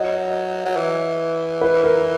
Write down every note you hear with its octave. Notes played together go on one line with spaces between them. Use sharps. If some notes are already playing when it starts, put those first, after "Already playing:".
Already playing: F#3 D#5
F#3
E3
B4
A#4